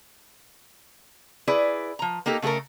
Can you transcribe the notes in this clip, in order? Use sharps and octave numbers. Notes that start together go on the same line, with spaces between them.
E4 G#4 B4 D5
F3 A#5
A#3 D#4 G4 A4
C#3 A3 F#4 A4 A#4